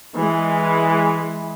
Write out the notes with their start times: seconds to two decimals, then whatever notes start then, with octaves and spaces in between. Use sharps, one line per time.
0.17 E3 G#3